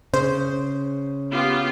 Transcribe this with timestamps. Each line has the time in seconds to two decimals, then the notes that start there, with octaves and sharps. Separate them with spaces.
0.14 C#3 C5
1.31 B3 F4 G4